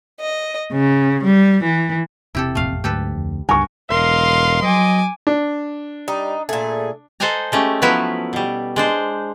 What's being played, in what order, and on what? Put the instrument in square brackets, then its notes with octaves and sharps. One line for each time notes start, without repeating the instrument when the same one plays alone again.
[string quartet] D#5
C#3
G3
E3
[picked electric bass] E1 C3 C4 [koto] E4 G4 A4
[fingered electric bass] A1 F2 A#2 [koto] A3 F5
[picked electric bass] D2 [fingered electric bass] G#2 F#3 [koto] G4 A4 B4
[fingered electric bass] F2
[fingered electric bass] C#2 D3 [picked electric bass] G2 [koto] B3 A#4 [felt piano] G#5 C#6
[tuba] E1 [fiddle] A#4 D#5 [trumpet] F5 [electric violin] C6
[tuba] F#3 [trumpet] D#5 [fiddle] G#5 D6
[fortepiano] D4
[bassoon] G3 [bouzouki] D#4
[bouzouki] A#2 G#4 [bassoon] A3
[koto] A4 C5 D#5 F#5 G#5 A#5
G#3 A3 C#4 G4
F3 F#3 A3 B3 E4 F#4
B2 G3
G#3 D4 C5